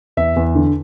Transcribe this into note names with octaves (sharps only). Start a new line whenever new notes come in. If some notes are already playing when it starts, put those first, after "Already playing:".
E2 E5
E2
D3